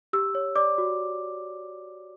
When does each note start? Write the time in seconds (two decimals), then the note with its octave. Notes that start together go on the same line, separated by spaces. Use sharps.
0.13 G4 E6
0.35 C#5
0.56 D5 D6
0.78 F#4